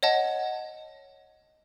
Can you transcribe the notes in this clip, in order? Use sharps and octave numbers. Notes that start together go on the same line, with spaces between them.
C#5 D#5 F#5 A5